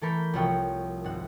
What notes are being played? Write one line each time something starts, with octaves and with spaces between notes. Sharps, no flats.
E3 A3 A4 A#4 B5 G6
C2 F3 F#4 C#5 F#5 G5
G#1 F#5